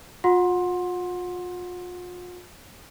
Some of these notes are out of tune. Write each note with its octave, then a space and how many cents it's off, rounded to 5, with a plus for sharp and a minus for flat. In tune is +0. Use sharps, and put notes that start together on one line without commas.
F4 +35 F#5 -25 C6 +15